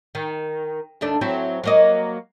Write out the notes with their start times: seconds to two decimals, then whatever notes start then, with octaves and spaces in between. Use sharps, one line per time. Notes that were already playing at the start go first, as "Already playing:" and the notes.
0.15 D#3
1.01 D#2 A3 D4
1.21 F#3 C4 E4
1.64 F#3 A#3 D#5